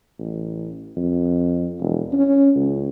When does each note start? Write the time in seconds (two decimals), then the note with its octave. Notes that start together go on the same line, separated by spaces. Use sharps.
0.19 A1
0.97 F2
1.80 E1
2.13 C#4
2.55 C#2